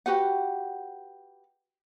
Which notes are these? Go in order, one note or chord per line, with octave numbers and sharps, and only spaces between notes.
F#4 G4 B4 F#5